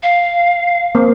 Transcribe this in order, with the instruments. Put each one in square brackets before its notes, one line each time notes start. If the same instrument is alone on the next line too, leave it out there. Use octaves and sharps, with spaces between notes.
[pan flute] F5
[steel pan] A#3 C4 C5